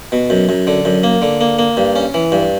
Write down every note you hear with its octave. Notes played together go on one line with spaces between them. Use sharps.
B2
F#2
F#2
D3
F#2
A#3
D3
A#3
A#3
G2
C#4
E3
G2